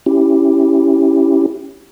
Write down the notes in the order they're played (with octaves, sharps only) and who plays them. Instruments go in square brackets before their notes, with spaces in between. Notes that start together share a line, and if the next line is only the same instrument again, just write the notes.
[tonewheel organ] C#4 E4 G4